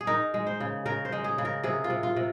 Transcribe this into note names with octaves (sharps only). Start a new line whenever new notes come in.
G#4
D#4 A#4
G#3
C5
C#3
C#3 A#4
C5
G#3
G#4
C#3
A#4
C3 G#4
F4
C3
F4
C3